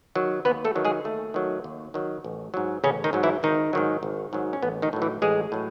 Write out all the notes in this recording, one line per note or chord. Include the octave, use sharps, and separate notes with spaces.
D#3 F#3
D#2 B3 B4
A3 A4
D#3 F#3
G#3 G#4
D#2 A3
D#3 F#3
D#2
D#3 F#3
A1
G#2 F#3
A1 C#3 C#4
D#3 D#4
G#2 F#3
E3 E4
G#1 D#3 D#4
G#2 D#3 F#3
G#1
G#2 D#3 F#3
C#4
A1 B3
D#3 D#4
A2 F#3
E3 E4
A1 G#3 G#4
A2 F#3